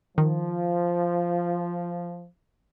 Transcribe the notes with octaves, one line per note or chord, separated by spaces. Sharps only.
D#3 F3